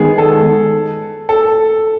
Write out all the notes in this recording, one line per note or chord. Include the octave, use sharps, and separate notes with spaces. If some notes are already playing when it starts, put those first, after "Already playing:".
Already playing: D#3 G#3 B3 G#4
A4
A4